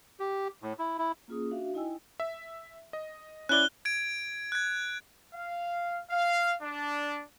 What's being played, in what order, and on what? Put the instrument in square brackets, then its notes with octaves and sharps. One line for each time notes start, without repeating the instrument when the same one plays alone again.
[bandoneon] G4
A2
E4
E4
[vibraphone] A#3 C#4 F4 G#4 D#6
D4 F#4 E5 F5
D#4 E4 D#5 G5 G#5 E6
[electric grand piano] E5
D#5
[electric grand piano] C#4 E4 D5 [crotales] F#6 G7
[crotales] G#6 D7
F#6 G#6
[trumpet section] F5
F5
D4